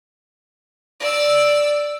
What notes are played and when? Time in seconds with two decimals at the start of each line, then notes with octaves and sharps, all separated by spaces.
1.00 D5 E6